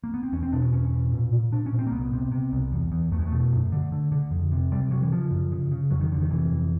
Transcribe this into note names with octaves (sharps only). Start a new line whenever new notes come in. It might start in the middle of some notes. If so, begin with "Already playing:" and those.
A#3
B3
C4
E2 C#4
C4
B2 D4
C#4
E2 C#4
B2
A#2
A#2
A#2 D4
C#4
A#2
C4
A#3
C2 B3
C3
C3
C2
E2
E2
E2 A3
G#3
A3
B2
F#2
D3
D3
D3
F2
C3
C3 G3
C3 F#3
E3
C#3 F3
F#2
C#3
C#3
F2 F#3
D#3
F2 D3
D#3
C3 E3
F2